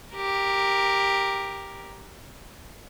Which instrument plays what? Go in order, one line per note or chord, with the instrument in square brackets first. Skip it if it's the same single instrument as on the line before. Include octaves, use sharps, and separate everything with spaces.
[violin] G4 A#4